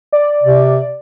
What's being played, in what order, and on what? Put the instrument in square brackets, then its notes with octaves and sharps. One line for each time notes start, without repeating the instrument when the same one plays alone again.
[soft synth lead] D5
[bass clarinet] C3